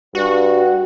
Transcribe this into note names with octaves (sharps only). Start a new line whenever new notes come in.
G2 F#4